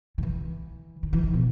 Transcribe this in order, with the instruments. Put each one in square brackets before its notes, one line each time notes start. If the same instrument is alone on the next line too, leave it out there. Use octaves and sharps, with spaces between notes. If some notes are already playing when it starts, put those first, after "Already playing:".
[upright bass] D#3
E3
D#3
E3
D#3
B2